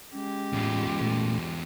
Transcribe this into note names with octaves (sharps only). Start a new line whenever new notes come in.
G#3 C#4 G4
E2 A2 F4
A#2 A3